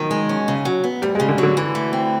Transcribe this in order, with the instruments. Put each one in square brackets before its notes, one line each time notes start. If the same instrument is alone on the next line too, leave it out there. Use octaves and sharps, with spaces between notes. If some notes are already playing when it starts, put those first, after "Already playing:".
Already playing: [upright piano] B2 F3 F#3 [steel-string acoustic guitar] D#3
[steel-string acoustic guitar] G#3
C#4
C#3
F#3
B3
[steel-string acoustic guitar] D2 [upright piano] G3
[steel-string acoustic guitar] C#3 [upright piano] G#3
[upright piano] D3
[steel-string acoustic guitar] F#3
[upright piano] D3
[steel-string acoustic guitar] E3
A3
C4